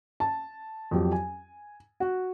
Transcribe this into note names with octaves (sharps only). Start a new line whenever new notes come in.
A5
F2 F#3 G4
G#5
F#4